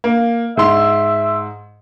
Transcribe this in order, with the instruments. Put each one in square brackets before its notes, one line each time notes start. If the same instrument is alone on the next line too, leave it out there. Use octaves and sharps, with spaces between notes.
[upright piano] A#3
[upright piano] G#2 C6 [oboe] E5